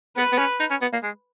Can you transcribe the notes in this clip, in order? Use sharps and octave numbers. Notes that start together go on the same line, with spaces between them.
B3 B4
B3
C#4
D#4
C#4
B3
A#3
G#3